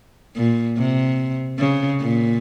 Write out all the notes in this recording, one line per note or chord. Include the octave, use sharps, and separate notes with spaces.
A#2
C3
C#3
A#2